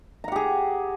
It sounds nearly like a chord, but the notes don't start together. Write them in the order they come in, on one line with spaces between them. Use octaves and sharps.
A#5 F#5 G4 G#4